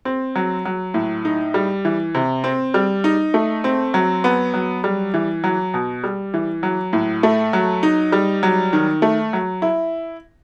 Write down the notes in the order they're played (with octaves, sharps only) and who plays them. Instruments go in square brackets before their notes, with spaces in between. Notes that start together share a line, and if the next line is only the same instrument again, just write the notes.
[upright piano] C4
F#3
F#3
A2
D#4
G3
E3
C3
C4
G3
D#4
A3
C4
F#3
B3
F#3
G3
E3
F#3
B2
G3
E3
F#3
A2
A3
F#3
D#4
G3
F#3
D#3
A3
F#3
E4